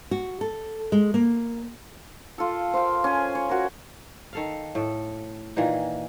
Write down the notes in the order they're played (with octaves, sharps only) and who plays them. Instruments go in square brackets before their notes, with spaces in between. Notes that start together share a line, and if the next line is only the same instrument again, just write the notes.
[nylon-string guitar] F#4
A4
G#3
A#3
[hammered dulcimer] F4 A4
C5 F5 G5
C#4 G#5
C#5
F#4 A#4
[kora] D#3 A4 F5
A2 A4
A#2 D#3 E3 D#4